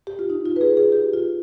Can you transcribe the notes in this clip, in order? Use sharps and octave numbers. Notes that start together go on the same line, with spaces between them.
G4
F4
D#4
F4
B4
G#4
G#4
G4
F4